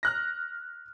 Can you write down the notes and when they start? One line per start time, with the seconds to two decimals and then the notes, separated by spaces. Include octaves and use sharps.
0.03 F6 F#6 A#6